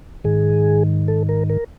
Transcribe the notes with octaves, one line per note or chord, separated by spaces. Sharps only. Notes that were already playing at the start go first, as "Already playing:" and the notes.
G#2 D#3 G#4
A4
A#4
A#4